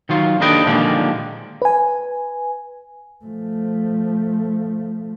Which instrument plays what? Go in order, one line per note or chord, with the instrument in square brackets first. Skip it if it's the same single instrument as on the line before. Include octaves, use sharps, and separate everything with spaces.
[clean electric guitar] D#3 F#3 F4
D#2 D4 A4 B4 D#5 G5
A#2 D3 D#3 F3 G3 G#3
[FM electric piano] B4 G#5
[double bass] F3 A3